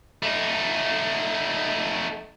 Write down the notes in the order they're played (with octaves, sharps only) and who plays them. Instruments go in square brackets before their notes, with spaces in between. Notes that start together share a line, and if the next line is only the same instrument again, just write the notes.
[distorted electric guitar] A3 D#4